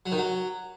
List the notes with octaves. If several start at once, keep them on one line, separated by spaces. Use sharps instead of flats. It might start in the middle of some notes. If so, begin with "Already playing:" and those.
F#3
D#3
F#3